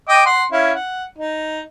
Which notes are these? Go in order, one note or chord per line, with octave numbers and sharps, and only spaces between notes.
D#5 G5 D6
F#5 C6
C#4 E4 F5
F#5
D#4